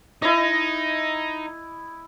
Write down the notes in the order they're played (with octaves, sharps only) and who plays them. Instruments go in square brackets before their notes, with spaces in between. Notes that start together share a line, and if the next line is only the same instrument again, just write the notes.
[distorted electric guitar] D#4 [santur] E4 D#5